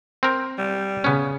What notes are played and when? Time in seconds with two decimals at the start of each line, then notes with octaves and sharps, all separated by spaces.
0.23 C4 A#4
0.58 G3
1.04 C#3 B3 C#4